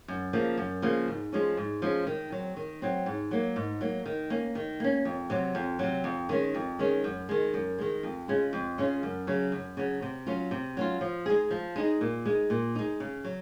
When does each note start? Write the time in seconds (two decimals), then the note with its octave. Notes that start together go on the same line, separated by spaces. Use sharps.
0.08 F#2
0.33 C#3 F3 A#3
0.57 F#2
0.82 C#3 F3 A#3
1.08 G#2
1.33 F3 G#3 C#4
1.57 G#2
1.82 F3 G#3 C#4
2.07 D#3
2.32 F#3 C4
2.56 D#3
2.82 F#3 C4
3.06 G#2
3.31 F#3 A#3
3.56 G#2
3.81 F#3 A#3
4.06 D#3
4.30 A#3 C#4
4.55 D#3
4.80 A#3 C#4
5.05 F2
5.30 C3 F#3
5.55 F2
5.79 C3 F#3
6.04 F2
6.29 D#3 G#3 C#4
6.55 F2
6.79 D#3 G#3 C#4
7.04 F#2
7.29 D#3 G#3
7.54 F#2
7.78 D#3 G#3
8.03 F2
8.28 C#3 G#3 C#4 F4
8.53 F2
8.78 C#3 G#3 C#4 F4
9.03 F#2
9.27 C#3 F#3
9.52 F#2
9.77 C#3 F#3
10.02 C3
10.26 F#3 C#4 F4
10.51 C3
10.77 F#3 C#4 F4
11.01 F3
11.26 G#3 D#4 G#4
11.51 F3
11.76 G#3 D#4 G#4
12.01 A#2
12.25 G#3 D#4
12.50 A#2
12.75 G#3 D#4
13.00 C#3
13.24 F#3